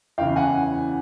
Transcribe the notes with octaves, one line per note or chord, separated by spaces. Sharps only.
E2 C#3 E3 F5 G5
F#5 G#5